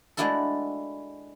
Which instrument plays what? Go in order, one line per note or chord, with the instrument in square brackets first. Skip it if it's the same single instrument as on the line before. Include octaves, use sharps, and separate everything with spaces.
[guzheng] G#3 A3 D4 E4 F#4 A4